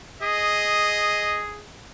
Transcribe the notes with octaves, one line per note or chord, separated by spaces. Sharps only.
G#4 D#5